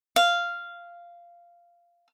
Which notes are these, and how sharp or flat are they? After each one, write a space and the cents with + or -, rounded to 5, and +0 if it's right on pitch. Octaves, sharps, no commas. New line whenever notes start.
F5 -10